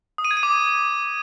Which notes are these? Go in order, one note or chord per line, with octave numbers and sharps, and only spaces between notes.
D#6
D#7
G#6
D#7
D6